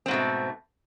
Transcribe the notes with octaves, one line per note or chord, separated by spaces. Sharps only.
G#2 B2 A3 C4